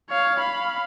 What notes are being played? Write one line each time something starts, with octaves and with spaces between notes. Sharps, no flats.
C#5 F5
F5 B5